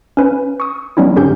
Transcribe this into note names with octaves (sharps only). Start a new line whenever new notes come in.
C#4 B4
C#6 D#6
F#3 G3 B3 C#4 D#4 E4
G#2 D3 C#4 G4 G6